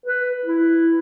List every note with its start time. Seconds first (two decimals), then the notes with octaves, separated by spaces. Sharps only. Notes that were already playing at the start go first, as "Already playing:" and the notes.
0.06 B4
0.46 E4